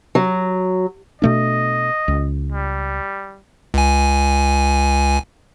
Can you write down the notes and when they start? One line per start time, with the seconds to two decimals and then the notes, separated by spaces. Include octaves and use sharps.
0.15 F#3
1.22 B2 A3 D4 D#5
2.08 C#2
2.52 G3
3.74 C#2 G#5